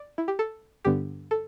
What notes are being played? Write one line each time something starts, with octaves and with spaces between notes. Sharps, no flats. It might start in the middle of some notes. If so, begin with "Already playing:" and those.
Already playing: D5
E4
G4
A4
G2 D3 B3 G4
A4